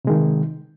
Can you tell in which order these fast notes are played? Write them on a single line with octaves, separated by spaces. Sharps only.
C3 G#3 D#3